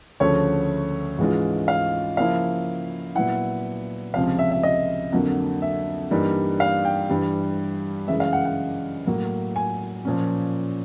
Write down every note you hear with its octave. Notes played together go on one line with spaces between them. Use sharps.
D2 C#3 F3 A3 C#5
G#2 E3 G#3 C#4 F4
F5
C#3 F3 A#3 C#4 E4 F5
A#2 F#3 B3 E4 F#5
C#2 C3 F3 F5
E5
E5
D#5
F2 D3 F#3 A#3
E5
G2 E3 G3 A#3 D#4
F5
G5
G2 E3 G3
F#2 C#3 E3 G#3 E5
F5
F#5
F#5
A2 F#3 A#3
G#5
A#2 F3 A#3 C#4